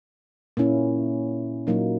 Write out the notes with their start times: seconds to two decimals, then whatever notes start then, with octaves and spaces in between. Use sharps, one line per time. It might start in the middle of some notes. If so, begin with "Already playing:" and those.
0.57 A#2 A#3 C#4 E4
1.67 A#2 F#3 A#3 D#4